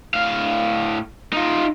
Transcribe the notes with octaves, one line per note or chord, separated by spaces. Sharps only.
A2 F5
D#4 F4